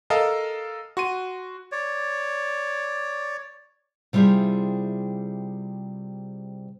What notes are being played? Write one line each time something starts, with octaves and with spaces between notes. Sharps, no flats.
A4 A#4 D#5 F5 A5
F#4 C6 D#7
C#5 D5
C3 G3 E4 F4 G#4 E5